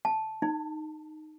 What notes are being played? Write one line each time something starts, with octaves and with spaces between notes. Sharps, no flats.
A5
D#4